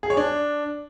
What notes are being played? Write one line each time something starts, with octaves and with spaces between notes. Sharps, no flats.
G#4
C#5
D4